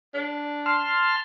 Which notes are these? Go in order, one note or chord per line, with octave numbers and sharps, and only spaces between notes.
D4
A5 C6 F6